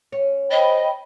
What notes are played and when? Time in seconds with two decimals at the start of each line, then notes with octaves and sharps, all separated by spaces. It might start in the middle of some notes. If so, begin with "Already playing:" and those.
0.12 C#4
0.50 C5 D#5 G5 B5